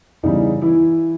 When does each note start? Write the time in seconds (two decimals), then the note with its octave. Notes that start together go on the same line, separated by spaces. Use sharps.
0.23 E2 C#3 E3 G3 D#4
0.62 E3 E4